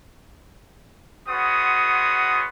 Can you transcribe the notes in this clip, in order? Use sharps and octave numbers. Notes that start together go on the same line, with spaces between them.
G#3 B3 C#4 F#4 C6 D#6